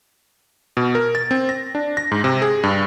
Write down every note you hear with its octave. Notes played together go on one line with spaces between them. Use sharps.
B2
A#4
A6
C4
A#6
D4
A#6
G#2
C3
G#4
G2